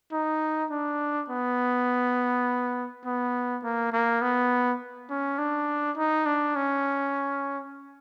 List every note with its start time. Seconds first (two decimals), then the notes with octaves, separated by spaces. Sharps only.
0.13 D#4
0.71 D4
1.30 B3
3.05 B3
3.63 A#3
3.93 A#3
4.22 B3
5.10 C#4
5.39 D4
5.97 D#4
6.26 D4
6.56 C#4